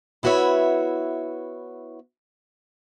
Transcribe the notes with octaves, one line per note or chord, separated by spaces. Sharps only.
B3 E4 F#4 B4 C#5 E5